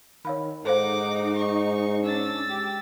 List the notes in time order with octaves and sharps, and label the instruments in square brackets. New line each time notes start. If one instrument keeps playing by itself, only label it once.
[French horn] D#3 [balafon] C#5 F5 B5
[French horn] G#2 [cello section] D#4 [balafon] A4 C5 F5 [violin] F#5 D6
[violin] C#6
[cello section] C#4 D4 [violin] E6 A6
[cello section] G#3 G4